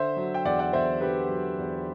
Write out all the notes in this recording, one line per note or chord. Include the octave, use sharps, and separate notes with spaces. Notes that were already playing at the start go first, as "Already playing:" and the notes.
Already playing: D3 C5 E5
F#3
G5
E2 D5 F#5
D5 F#5
E2 C5 E5
D3 G4 B4
F#3
E2